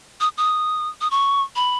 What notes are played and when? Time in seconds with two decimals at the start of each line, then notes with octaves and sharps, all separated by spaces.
0.21 D#6
0.37 D#6
1.01 D#6
1.11 C#6
1.56 B5